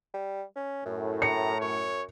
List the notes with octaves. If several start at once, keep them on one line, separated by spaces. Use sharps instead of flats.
G3
C#4
F#2 A2
A#5 C#7
F#2 C#5